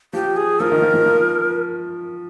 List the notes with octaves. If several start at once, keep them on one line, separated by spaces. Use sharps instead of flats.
F3 G4
G#4
F3 A#4
D#3
F3
F3
F3